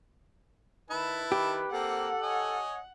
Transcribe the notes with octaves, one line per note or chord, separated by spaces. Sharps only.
D#3 E4 B4 A5
D#3 G4
A#3 C4 A4 F#5
C#5 D#5 G#5